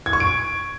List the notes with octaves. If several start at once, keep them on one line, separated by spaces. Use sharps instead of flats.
G#6
C#6
D7